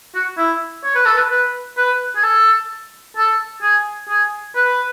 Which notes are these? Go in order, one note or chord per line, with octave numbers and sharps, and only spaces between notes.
F#4
E4
C#5
B4
A4
B4
B4
B4
G#4
A4
A4
G#4
G#4
B4